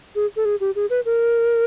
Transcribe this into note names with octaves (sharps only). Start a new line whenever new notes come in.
G#4
A4
G#4
G4
G#4
B4
A#4